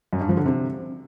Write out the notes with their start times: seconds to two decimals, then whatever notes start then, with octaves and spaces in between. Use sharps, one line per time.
0.13 F#2
0.21 G2
0.29 F3
0.37 D3
0.45 C3